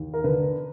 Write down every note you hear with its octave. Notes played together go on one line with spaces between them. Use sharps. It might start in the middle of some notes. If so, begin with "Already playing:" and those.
Already playing: D#2
A#4
D3 B4